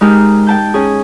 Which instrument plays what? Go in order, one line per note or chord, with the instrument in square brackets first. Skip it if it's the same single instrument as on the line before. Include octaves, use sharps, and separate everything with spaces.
[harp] G#3 D#4 G4 A#4
G5 A5 G6
C#4 G#4